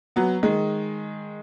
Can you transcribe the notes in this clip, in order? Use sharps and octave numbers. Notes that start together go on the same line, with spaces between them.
F#3 B3
D#3 G#3